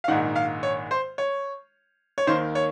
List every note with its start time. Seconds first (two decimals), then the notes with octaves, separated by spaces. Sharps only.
0.04 F5
0.08 A#1 G#2 D#3 F#5
0.36 F5
0.63 C#5
0.91 C5
1.18 C#5
2.18 C#5
2.27 D#2 D#3 C5
2.55 C#5